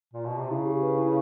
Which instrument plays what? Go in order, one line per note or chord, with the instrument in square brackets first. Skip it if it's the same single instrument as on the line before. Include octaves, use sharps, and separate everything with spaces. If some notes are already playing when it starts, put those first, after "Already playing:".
[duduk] A#2
B2
C3
[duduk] C#3 [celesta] E4
[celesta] G4
B4
E4